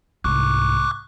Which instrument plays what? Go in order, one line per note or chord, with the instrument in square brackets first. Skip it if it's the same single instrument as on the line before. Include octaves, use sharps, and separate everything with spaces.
[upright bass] C2 G#2 [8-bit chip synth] C#6 D6 F#6